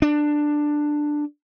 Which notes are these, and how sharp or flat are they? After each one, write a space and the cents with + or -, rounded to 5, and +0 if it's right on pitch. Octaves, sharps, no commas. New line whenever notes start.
D4 +10